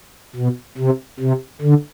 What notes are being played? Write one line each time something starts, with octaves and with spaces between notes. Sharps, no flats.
B2
C3
C3
D3